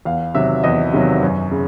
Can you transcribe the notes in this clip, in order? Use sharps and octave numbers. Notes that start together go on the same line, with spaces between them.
E2 F5
C3 D#3 F#3 E5
E2 D#5
C3 D#3 F#3
F#2
C#3